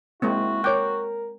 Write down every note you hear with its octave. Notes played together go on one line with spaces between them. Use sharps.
G#3 A#3 C4 E4 F#4
A#4 C#5 G5 D6 F#6